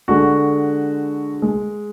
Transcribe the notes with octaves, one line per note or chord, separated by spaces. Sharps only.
D3 G#3 F#4
G#3